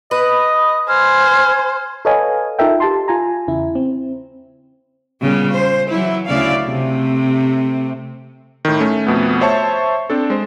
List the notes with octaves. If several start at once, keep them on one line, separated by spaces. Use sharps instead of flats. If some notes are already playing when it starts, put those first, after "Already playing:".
B4 D#5
C5 G#5 F6
A4 B4 C#5 D#5 F5 G#5
D#4 F4 A4 A#4 E5 G5
G4 A5 C6
F4 G#5 A#5
E2 C#3 E4
C4
A#2 C#3 G3 B3
C5
E3 F#3 E4
D2 C#3 E4 D5 F5
C3 A3
A2 D#3
A3 C#4
F2 B2 A3 B3
C5 C#5 E5 A5 C#6
C4 D4 A4
G#3 C5